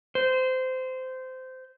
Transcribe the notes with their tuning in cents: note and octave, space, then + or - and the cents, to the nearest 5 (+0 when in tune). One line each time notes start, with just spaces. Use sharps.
C5 -20